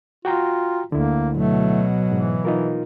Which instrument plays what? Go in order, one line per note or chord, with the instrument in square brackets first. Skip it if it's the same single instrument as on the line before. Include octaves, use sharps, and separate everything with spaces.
[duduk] F4 [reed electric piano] F#4 G5 A#5
[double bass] D2 [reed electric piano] D3 E4 [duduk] A#3
[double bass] B2 F#3 [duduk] A3
[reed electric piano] G#2 [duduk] E3
[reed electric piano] D#4 F4 A#4